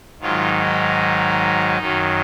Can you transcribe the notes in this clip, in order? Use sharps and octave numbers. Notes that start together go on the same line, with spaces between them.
G#2 D#3 F#3 F4
D#4
F#2 D#3 F#3